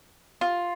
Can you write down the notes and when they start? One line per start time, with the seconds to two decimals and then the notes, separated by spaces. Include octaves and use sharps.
0.41 F4